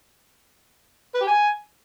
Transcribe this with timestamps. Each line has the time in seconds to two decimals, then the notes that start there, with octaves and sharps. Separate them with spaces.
1.15 B4
1.21 G4
1.27 G#5